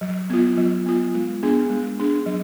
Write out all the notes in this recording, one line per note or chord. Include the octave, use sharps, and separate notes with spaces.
F#3
B3 F4
F#3
B3 F4
G#3
B3 D4 G#4
G#3
B3 D4 G#4
F#3